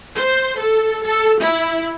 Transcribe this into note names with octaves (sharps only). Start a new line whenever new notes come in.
C5
A4
A4
E4